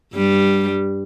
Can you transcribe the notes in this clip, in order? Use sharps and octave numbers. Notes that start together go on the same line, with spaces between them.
G2 G3